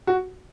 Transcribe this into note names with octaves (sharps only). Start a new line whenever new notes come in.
F#4